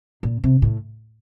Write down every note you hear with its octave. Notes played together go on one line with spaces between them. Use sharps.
A#2
C3
A2